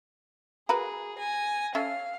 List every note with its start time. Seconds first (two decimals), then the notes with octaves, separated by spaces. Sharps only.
0.69 F#4 G#4 A#4 B4
1.19 G#5 A#6
1.75 C#4 A4 E5 F5